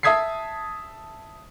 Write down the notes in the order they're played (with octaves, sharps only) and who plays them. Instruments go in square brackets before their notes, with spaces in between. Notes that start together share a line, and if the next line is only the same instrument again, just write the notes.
[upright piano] E5 A5 D#6 G#6 B6 C7